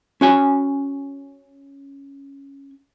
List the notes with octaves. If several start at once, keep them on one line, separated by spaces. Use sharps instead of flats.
C#4 F#4 G#5